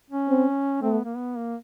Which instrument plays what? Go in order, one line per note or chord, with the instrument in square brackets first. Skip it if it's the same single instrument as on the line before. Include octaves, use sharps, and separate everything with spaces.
[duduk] C#4
[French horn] C4
[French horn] A3 [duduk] C4
[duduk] B3
A#3
B3
A#3